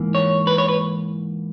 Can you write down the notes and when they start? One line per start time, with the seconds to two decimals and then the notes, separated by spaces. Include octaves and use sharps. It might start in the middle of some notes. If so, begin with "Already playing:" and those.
Already playing: G#2 E3 A#3
0.15 C#5
0.47 B4
0.58 C#5
0.68 B4